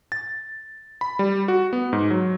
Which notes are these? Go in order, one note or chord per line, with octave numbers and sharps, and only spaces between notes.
A6
B5
G3
F#4
B3
G#2
F#3